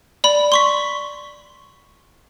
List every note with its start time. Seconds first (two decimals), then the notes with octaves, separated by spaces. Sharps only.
0.24 D5 B5
0.52 C6 C#6 B6